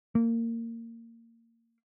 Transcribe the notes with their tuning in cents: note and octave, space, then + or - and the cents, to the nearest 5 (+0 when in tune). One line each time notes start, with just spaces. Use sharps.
A#3 -20